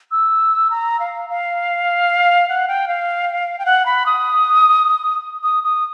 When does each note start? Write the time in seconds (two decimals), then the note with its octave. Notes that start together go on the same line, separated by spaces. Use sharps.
0.11 E6
0.70 A#5
1.00 F5
1.30 F5
2.49 F#5
2.68 G5
2.88 F5
3.59 G5
3.66 F#5
3.86 B5
4.06 D#6
5.43 D#6
5.64 D#6